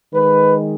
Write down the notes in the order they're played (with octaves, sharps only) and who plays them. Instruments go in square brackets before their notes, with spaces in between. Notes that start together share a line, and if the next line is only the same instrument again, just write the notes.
[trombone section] D#3 G#3 B4